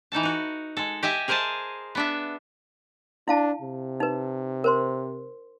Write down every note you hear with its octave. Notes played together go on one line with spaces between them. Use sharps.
E3 D#4 A4 A5
D#4 F#4
G#3 A4
G4 D#5 E5 G#5
G#4 A#4 C5 D#5 G#5 A5
B3 D4 E5
D4 E4 F5 A5
C3
D#4 B4
A#4 C5 C6